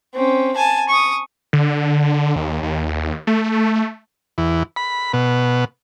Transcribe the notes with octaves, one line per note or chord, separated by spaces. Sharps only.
C4 C#4
G#5 A5
C#6 D#6
D3
D#2
D#2
A3
E2
B5
B2